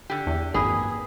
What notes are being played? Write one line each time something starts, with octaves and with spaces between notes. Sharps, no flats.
D3 G4
E2
G#1 F#2 A#3 G#4 B4 D#6